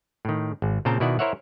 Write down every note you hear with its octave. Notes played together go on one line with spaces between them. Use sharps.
A2 D#3
G#1
A#2 C#3 C4 G5 A5 A#5
B2 D#3 E4 D5 F#5
E4 A#4 C5 C#5 E5 F#5